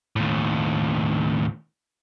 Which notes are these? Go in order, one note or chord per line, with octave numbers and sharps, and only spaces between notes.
D#2 A2